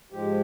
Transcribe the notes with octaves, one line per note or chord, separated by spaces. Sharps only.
G#2 F3 G#3 G4